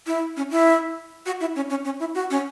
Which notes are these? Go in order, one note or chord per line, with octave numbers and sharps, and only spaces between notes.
E4
C#4
E4
F#4
E4
C#4
C#4
C#4
E4
F#4
C#4